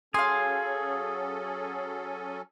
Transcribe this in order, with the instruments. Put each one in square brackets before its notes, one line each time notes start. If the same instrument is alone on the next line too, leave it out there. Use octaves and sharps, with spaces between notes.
[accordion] F#3 C#4 A4 [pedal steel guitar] G#4 [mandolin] F5 C6